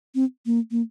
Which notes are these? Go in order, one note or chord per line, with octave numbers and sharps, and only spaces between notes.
C4
A#3
A#3